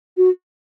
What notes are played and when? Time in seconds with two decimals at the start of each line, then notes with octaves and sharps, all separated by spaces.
0.17 F#4